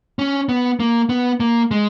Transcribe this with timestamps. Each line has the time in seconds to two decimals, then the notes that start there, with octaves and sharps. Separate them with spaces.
0.19 C#4
0.49 B3
0.80 A#3
1.09 B3
1.40 A#3
1.71 G#3